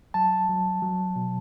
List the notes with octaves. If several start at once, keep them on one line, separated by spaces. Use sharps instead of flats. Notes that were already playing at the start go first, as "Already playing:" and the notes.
F#3 A5
F#3
F#3
B2